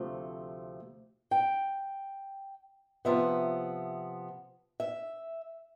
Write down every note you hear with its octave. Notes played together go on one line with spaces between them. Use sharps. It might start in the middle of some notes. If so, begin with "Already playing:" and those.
Already playing: D2 C3 F3 A3
G5
C3 F3 B3 E5
E5